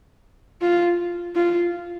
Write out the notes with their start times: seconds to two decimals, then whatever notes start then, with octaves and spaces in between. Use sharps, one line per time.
0.61 F4
1.35 F4